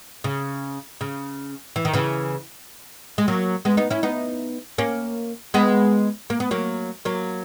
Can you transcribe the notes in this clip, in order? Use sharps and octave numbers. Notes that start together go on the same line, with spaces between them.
C#3
C#3
E3
D#3
C#3 E3
G#3
F#3 A#3
G#3 B3
B3 D#4
C#4 E4
B3 D#4
A#3 C#4
G#3 B3
A#3
B3
F#3 A#3
F#3 A#3